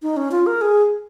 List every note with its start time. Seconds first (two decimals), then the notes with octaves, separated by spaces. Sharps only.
0.02 D#4
0.17 C#4
0.32 F4
0.47 A#4
0.61 G#4